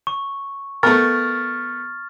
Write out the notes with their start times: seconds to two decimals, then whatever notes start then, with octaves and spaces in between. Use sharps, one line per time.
0.07 C#6
0.83 A3 B3 A#4 C#6 F6 A6